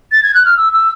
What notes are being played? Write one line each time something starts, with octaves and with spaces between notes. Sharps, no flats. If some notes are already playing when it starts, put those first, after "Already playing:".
A6
G#6
F#6
F6
E6
E6